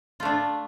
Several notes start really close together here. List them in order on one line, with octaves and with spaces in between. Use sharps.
F4 A3 D4